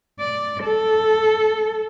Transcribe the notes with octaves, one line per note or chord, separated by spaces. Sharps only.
D5
A4